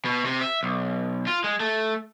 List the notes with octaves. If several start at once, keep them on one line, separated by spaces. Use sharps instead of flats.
B2
C3
E5
B1
F4
G#3
A3